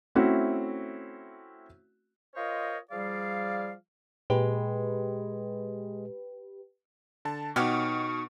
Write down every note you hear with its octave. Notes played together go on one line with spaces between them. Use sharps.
A3 C4 C#4 E4 F#4
F4 A#4 C5 C#5 D#5
F3 G3 G#4 D5 F5
A#2 G#3 G4 B4
D3 A5
B2 F#3 B3 D#4 F#4 G4 C#6 F6